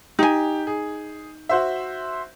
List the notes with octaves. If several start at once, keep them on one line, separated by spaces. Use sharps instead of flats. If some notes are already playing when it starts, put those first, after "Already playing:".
D#4 G4 G#5
G#4
F#4 C5 E5